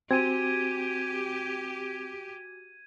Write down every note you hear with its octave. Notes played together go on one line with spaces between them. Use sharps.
C4 F#4 G4 G#5 G#6 D#7